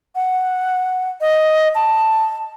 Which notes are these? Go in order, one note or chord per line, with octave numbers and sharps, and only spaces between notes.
F#5
D#5
A5